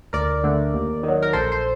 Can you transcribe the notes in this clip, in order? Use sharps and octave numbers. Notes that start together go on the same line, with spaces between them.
D2 A#4 D5
D3 A3
D#2
D#3 F#3
A#4
A#1 A4 C5
C5